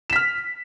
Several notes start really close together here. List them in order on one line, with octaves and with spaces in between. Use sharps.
E7 B6 F6